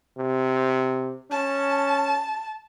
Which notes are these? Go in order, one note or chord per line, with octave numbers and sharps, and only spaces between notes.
C3
C#4 A5